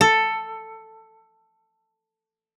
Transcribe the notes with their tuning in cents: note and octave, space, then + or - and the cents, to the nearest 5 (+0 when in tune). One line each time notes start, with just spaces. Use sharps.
A4 +10